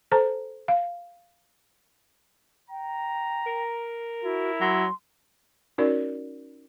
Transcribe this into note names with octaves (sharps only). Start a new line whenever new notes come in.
A4 C5 A5 A#5
F5
G5 A#5
A#4
E4 F#4
F#3 C6
C#4 D#4 F#4 A#4 C#5 D5